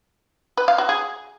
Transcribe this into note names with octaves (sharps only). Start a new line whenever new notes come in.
B4
F5
F#4
G#4